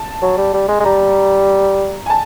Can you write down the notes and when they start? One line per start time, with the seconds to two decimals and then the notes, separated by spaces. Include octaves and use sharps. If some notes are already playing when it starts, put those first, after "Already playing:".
Already playing: A5
0.22 F#3
0.37 G3
0.54 G3
0.68 G#3
0.80 G#3
0.84 G3 A#5
2.06 G#5
2.10 A5